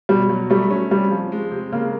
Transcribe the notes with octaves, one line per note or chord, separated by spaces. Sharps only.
B2 G3
F#3
G3 A3
C#4
C3 G3
F3
G#3
C3
C#3 A#3